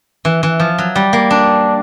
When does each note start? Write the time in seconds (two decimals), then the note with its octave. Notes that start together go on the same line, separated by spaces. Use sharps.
0.25 E3
0.43 E3
0.60 F3
0.78 F#3
0.95 G3
1.13 A#3
1.30 D4